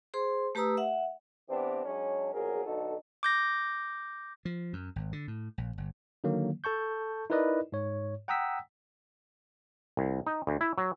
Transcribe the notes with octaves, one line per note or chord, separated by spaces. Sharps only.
G#4 C5 C6
A3 G4 B4 A#5 D#6 E6
E5 F#5
E3 B3 C4 D4 G4
F#3 G#3 C#4 D4
A#1 E2 F#3 G#4 A#4
B1 D3 D#4 F#4 A4
D6 G6 A#6
F3
F#2
G#1
D3
A2
A#1
G1
D3 D#3 F#3 A#3
A4 A5 C#6 G6
D#4 E4 A#4 B4 D5 D#5
G#2 C#5
F#5 G5 A#5 D#6 E6 B6
C2
D#4
D2
E4
F#3